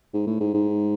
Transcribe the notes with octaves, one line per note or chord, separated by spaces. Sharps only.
G#2
A2
G#2
G#2